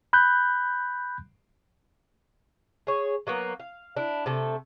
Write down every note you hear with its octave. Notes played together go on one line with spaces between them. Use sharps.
B5 F#6 G6
G#4 C#5
F#3 A#3 B3
F5
D4 E4
C3 A3 A4